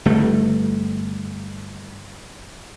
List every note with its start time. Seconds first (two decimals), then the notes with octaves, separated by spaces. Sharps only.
0.05 G1 A3